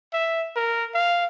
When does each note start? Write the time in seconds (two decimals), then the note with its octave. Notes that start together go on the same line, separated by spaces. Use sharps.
0.13 E5
0.56 A#4
0.94 F5